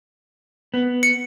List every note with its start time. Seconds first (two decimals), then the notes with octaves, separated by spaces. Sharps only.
0.74 B3
1.03 C#7